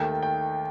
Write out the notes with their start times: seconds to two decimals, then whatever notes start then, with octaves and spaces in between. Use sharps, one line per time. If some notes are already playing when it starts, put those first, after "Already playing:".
Already playing: D#2 D#3 A3 G5
0.23 G5